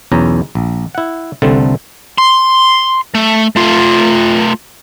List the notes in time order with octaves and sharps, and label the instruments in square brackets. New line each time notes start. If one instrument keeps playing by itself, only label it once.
[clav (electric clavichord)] B1 E2 C#4 A#5
A#1
E4 F#5
C2 D3 A3 C4 A5
[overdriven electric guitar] C6
A3
A3 F4